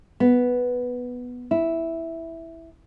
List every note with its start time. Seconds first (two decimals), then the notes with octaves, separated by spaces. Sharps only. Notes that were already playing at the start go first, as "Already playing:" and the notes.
0.20 B3
1.51 E4